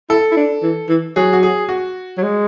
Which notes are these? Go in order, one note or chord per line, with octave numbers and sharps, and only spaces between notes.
E4 A4
E4
D4
E3
E3
F#3 G#4
F#4
G#4
F#4
F#3
G#3